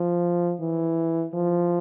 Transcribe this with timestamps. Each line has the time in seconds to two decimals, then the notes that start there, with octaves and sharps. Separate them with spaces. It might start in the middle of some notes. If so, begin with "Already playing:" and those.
Already playing: F3
0.61 E3
1.34 F3